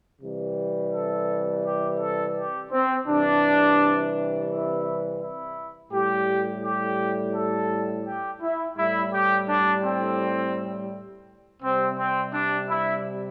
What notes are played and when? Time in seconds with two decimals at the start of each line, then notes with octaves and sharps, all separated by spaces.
0.22 C3 E3 G3
0.93 A4
1.65 G4
2.00 A4
2.36 G4
2.71 C4
3.07 C3 E3 G3 D4
4.49 E4
5.21 E4
5.92 A2 G3 G4
6.63 G4
7.35 A4
8.05 G4
8.41 E4
8.77 A2 G3 E4
9.13 G4
9.49 D4
9.84 C4
11.62 C3 G3 C4
11.98 C4
12.33 D4
12.69 E4